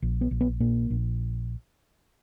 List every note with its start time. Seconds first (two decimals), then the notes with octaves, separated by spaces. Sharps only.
0.02 A#1
0.21 B3
0.31 A#1
0.41 B3
0.60 A#2 A#3
0.90 A#1